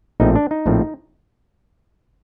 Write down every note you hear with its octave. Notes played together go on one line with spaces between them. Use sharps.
A#1 A2 F3 A3 C4 D#4
D4
D#4
A#1 A2 F3 A3 C4